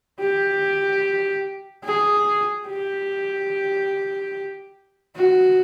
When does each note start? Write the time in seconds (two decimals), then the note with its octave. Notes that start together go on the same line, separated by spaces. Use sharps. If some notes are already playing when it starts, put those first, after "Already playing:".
0.20 G4
1.85 G#4
2.68 G4
5.16 F#4